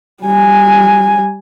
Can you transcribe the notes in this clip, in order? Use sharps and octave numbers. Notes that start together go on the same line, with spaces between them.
G3 G#5